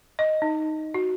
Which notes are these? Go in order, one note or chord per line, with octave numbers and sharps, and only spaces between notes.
D#5
D#4
F#4